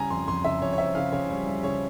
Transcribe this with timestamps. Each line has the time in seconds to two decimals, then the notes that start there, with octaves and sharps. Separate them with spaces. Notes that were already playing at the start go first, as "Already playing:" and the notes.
Already playing: C#3 G3 G#5 A#5
0.10 F2 C6
0.27 F2 C6
0.44 C#3 E5
0.61 F2 C#5
0.72 C#5
0.78 C4 E5
0.95 C#3 F5
1.12 C#3 C#5
1.30 G3 C#5
1.46 G3
1.63 C#3 C#5